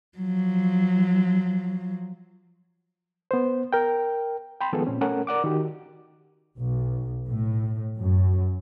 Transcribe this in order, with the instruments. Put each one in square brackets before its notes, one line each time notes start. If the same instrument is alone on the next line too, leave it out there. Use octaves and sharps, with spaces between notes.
[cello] F3 F#3
[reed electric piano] B3 C5
A#4 G5
G5 B5 C6
D#3 F3 G#3 B3 G#4 A4
A#2 C4 C#4
A3 C#4 A4 A#4 F#5
A#4 D5 F#5 D6
D#3 F#4 G4
[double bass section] B1
A2
F#2